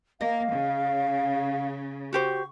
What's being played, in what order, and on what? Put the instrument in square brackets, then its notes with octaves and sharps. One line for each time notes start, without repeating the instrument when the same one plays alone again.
[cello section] A#3 [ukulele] D#5 [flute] F5
[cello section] C#3
[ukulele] F#4 G4 C5 [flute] C#6